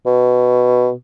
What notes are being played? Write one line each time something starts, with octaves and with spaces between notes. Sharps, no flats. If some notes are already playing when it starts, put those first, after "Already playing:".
B2